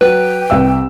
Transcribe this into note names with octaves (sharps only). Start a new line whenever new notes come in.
F#3 B4 G5
C2 E5 E6